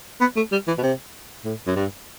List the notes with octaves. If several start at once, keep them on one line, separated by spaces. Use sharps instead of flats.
B3
A3
G3
E3
B2
C3
A2
F#2
G2